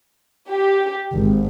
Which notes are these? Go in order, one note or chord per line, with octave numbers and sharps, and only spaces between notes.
G4
G#1